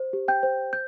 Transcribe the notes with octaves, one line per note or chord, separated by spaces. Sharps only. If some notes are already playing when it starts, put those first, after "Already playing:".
Already playing: C5
G4
G5 G6
C5
G6